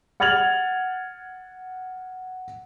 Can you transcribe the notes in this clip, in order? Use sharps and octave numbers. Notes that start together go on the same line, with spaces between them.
F#5 F6 G#6 A6 F7 F#7